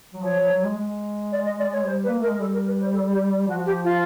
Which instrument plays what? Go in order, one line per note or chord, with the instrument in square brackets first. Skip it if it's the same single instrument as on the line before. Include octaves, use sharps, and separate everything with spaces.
[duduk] F#3
[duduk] F3 [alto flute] C#5
[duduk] F3
F#3
G#3
G#3
[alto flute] D5
D#5
D5
C#5
[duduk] G3 [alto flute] C5
[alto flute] B4
[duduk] A#3
[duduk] A3 [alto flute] A#4
[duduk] G#3
[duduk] G3 [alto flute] A4
[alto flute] A#4
B4
C5
A4
G4
[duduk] F3 [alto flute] F#4
[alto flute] G4
F4